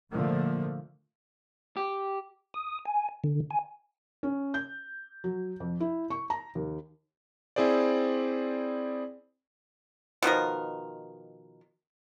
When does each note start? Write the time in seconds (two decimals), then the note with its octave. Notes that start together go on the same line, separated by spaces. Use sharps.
0.11 A#2 D3 F3 A3 A#3
1.77 G4
2.54 D#6
2.85 G#5
3.24 D3
3.51 G#5
4.23 C#4
4.54 G6
5.24 F#3
5.60 F2
5.80 E4
6.10 C#6
6.30 A#5
6.55 D#2
7.56 C4 E4 G#4 C5 D5
10.22 B2 D#3 F3 A#4